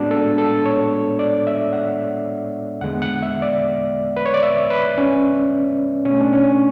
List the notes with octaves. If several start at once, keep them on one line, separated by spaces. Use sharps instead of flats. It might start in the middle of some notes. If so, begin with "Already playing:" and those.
Already playing: A2 G#3 B3 D4 F#4
A4
A4
C#5
D5
E5
F#5
E2 D3 G#3 B3 F#5
F#5
E5
D5
B4
C#5
D5
E5
B4
C#4
B2 A3 C#4
D4
C#4